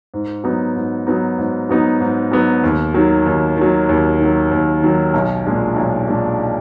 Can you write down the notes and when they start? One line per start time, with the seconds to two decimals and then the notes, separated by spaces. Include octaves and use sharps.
0.14 G#2
0.44 F#3 B3 D#4
0.75 G#2
1.07 F#3 B3 D#4
1.38 G#2
1.69 F#3 B3 D#4
2.00 G#2
2.32 F#3 B3 D#4
2.63 D#2
2.94 D#3 F#3
3.26 D#2
3.57 D#3 F#3
3.89 D#2
4.19 D#3 F#3
4.51 D#2
4.82 D#3 F#3
5.14 B1
5.45 A#2 G#3 D4
5.76 B1
6.07 A#2 G#3 D4